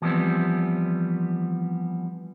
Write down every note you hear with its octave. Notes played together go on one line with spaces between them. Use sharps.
E3 F3 G3 B3 C4